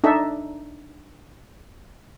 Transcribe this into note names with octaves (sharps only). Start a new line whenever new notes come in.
D4 D#4 A4 E5